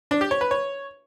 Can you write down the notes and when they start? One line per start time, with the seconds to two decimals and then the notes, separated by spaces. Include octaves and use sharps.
0.11 D4
0.21 G4
0.31 C#5
0.41 B4
0.51 C#5